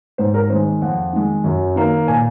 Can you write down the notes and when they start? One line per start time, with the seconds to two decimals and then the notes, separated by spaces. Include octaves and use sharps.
0.18 G#2 C5
0.34 A#4
0.50 D#3 G#3 C5
0.82 F2 F#5
1.13 D#3 G#3
1.44 F#2
1.76 D#3 A#3
2.08 A#2 G#5